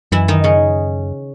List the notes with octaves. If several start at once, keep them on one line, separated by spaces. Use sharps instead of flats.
F#2 E3 E4
D#3 D#4
C#3 C#4